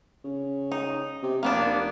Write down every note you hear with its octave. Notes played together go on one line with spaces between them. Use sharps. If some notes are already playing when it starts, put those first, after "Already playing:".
C#3
D#4
C3
F1 A#3 B3 D4